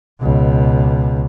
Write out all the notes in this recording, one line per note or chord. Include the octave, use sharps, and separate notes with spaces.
C#2 B2